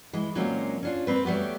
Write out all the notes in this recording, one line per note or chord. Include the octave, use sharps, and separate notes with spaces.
E3 G#3
A#2 F#3 G#3 A#3 C4 C#4
C#4 D4 F4
A#3 C4 B4
F#3 G3 A3 B3 G4